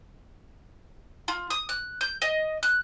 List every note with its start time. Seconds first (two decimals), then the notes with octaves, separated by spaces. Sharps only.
1.28 F4
1.50 D#6
1.69 F#6
2.01 G6
2.22 D#5
2.63 F#6